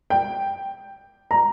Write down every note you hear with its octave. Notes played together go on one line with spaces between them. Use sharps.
G5
A#5